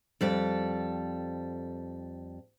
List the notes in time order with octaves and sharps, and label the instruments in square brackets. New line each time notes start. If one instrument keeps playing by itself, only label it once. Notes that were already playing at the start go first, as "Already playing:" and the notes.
[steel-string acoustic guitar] F2 G3 A4